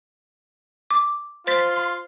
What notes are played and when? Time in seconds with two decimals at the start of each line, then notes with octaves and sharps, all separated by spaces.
0.91 D6
1.47 F4 C5 C6 A6 B6